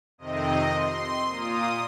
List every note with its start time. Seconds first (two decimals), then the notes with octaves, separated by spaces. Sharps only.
0.18 F2 C3 D#3 C4 D#5
0.72 C6
1.26 A#2 A#3 F4 D#6